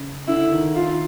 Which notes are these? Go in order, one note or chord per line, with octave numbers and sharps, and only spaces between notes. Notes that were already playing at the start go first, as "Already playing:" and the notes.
Already playing: C#3
D3 E4
D#3
D#3 F4